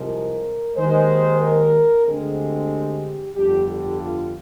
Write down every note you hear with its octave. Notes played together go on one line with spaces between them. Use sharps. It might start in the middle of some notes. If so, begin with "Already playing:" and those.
Already playing: C2 C3 F3 G#3 A#4
D#2 D#3 G#3 C5
A#4
D2 D3 G#3 C4 G#4
G4
G1 F2 D3 G3 D4 G4
G4
F4